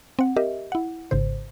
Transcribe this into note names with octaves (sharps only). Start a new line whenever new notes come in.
C4 F#5
G4 A#4 D#5 E5
E4 F#5
G#1 G#2 C#3 C5